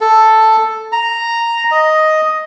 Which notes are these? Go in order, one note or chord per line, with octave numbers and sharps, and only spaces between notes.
A4
A#5
D#5